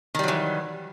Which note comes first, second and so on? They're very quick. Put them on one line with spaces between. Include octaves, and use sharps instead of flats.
D#3 G3 F#3 E3